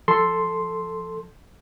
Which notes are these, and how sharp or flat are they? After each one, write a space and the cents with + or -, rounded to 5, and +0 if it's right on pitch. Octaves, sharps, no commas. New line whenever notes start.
F3 +0 A4 +0 C6 +0